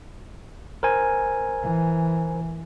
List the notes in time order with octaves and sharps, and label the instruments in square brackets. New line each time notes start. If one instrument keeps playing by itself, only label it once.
[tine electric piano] A#4 C5 G#5
[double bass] E3